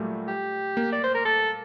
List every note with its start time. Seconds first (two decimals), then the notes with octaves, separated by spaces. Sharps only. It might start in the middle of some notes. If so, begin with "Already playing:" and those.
Already playing: A#2 F#3 G3 A3
0.28 G4
0.77 A#3
0.93 D5
1.04 C5
1.15 A#4
1.25 A4